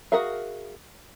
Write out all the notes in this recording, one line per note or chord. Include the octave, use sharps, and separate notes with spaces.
F#4 G#4 A#4 E5 F5